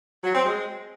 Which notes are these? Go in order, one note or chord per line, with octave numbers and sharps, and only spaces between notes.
F#3
C4
G#3